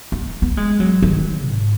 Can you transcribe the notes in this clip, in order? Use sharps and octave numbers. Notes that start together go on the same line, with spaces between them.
B3
B3
G#3
F#3
D#3
G#2